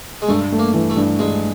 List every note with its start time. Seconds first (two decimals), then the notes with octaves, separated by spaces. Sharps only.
0.22 G#3
0.29 G2 A3
0.52 A3
0.59 A#3
0.74 E3
0.90 A3
0.97 G2
1.19 G2 G#3